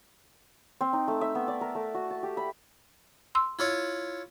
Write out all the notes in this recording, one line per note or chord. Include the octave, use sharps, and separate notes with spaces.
C4
D#4
A3
E5
B3
D5
A#4
A3
F#4
A5
G4
B5
C6 E6
E4 F4 C#5